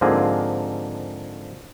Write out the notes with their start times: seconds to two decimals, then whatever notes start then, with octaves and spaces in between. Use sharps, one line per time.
0.01 G#2 D3 F3 A#3 C4 G#4